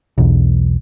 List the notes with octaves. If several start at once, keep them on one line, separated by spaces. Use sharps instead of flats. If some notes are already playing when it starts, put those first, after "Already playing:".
B1 E2